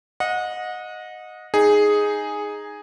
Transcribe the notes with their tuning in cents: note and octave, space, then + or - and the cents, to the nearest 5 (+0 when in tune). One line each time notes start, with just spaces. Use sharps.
D#5 +0 F#5 -30
D#4 +0 G#4 +0